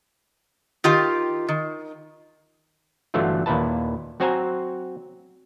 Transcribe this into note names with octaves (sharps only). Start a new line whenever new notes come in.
D#3 F4 G4
D#3
G1 D3 E3 F#3 A3 F4
D#2 A#2 E4 B4 A5
F#3 C4 F#4 C5 G#5 A#5